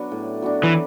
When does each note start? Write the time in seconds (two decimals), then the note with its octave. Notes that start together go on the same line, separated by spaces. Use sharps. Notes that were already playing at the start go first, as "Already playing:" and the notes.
Already playing: F#3 B3 D4
0.12 A2
0.42 F#3 B3 D4
0.63 E3